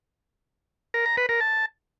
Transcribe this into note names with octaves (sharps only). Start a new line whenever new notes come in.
A#4
A#5
B4
A#4
A5